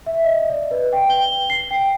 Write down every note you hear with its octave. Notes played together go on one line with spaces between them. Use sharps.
E5
D#5
D5
B4
G5
G7
C7
G5